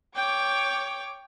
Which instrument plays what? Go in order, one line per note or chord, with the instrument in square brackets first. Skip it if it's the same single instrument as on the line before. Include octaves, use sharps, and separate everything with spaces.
[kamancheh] C#5 D6 [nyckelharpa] G5